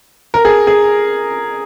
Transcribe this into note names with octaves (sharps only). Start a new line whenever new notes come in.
A#4
G#4
G#4